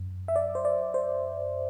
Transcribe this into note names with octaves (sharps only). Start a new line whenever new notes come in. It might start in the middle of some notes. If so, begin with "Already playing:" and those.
Already playing: F#2
E5
D5
C5
D5
C5